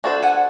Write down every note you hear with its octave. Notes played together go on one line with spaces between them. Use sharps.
D4 F#4 A4 C5
F#5 G#5